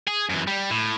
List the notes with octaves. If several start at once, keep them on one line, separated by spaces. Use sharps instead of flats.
G#4
F#2 E3
G3
A2